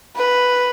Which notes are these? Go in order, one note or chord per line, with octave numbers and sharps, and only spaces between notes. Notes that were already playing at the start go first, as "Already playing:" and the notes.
B4